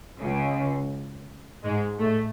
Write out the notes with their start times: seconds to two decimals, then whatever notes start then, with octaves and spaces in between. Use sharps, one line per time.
0.20 C#2 C#3
1.63 G#2 G#3
1.99 A2 A3